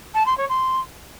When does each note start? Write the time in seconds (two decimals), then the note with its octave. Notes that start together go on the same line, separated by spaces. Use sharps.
0.14 A5
0.26 C6
0.37 C#5
0.49 C6